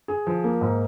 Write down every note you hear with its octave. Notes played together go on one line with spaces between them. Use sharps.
G#4
F3
A#3
G#2